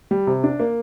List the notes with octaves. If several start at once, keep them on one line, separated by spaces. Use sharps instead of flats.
G3
C3
D4
A#3